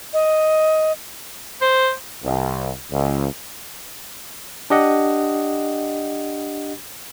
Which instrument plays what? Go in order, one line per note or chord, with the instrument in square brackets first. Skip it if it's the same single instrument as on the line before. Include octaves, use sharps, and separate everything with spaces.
[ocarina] D#5
[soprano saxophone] C5
[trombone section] C2
C#2
[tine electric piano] D4 G4 D#5 F#5